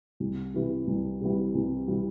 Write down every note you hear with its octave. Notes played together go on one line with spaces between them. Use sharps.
C2
C3 E3 G3
C2
C3 E3 G3
C2
C3 E3 G3